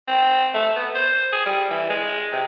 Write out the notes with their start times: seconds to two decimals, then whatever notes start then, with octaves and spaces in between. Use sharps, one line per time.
0.08 C4
0.54 A3
0.76 B3
0.95 C5
1.33 G#4
1.46 G3
1.71 E3
1.90 G#3
2.32 C3